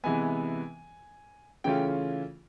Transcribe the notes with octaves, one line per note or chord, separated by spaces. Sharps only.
C3 E3 G#3 B3 G#5
C#3 E3 A3 C#4 F4 G5